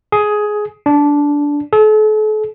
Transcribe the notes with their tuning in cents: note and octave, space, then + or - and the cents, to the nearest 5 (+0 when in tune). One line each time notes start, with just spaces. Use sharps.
G#4 +15
D4 -15
A4 -40